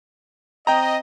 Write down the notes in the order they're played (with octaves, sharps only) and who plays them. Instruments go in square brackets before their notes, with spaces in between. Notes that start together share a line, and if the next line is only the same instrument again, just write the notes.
[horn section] C4 D#5 [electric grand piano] G5 A#5